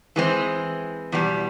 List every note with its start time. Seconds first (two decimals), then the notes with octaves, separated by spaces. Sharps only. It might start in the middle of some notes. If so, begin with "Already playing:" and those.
0.16 E3 G#3 C4
1.12 E2 B2 G3